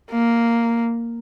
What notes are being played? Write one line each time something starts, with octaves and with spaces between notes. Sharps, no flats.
A#3